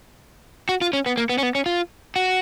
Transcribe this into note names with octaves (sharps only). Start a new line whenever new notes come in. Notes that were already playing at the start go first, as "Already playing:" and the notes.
F#4
F4
C#4
B3
A#3
B3
C#4
B3
C#4
F4
F#4